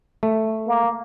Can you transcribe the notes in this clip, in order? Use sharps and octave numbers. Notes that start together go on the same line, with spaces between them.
A3
A#3